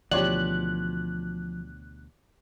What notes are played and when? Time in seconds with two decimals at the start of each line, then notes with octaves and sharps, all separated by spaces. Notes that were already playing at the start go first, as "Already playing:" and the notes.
0.11 D2 B2 E3 F3 G4 C#5 D5 F#6